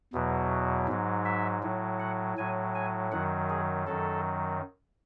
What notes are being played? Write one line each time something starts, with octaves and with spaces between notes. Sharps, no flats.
E2 B2 F#3
G#2 F#3
E5
A2 F#3
F#5
A2 F#3 G#5
G#5
F#2 D#3 F#3 F#5
G#4
F#2 D#3 F#3 A4